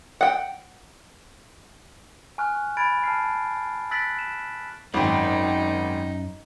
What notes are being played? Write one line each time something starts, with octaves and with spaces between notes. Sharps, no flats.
F#5 G5
G#5 C#6 F6 F#6
B5 G#6 A6 D7
A5 F6 C7
E6 F#6 A6 B6 D7 F#7
A6 E7
G#1 F#2 D#4 G5